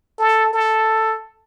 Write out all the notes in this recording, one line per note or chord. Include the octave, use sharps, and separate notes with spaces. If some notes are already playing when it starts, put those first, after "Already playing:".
A4
A4